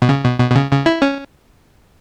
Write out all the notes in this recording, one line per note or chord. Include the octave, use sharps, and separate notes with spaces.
B2
C#3
B2
B2
B2
C#3
C#3
E4
C#4